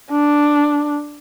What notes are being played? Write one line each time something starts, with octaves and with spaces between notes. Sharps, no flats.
D4